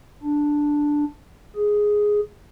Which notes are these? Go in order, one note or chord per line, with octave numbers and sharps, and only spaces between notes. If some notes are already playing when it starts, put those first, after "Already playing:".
D4
G#4